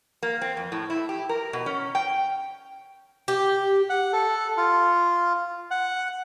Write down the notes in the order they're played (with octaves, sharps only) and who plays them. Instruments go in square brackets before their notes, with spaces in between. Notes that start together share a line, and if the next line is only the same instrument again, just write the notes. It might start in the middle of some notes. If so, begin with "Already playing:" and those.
[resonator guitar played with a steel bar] A#3
C4
F2
A2
E4
G4
A#4
B2
C#4
G5
[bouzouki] G4
[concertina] F#5
A4
F4
F#5